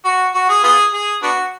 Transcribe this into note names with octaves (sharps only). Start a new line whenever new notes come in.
F#4
F#4
G#4
B3 F4 G#4
G#4
B3 D4 F#4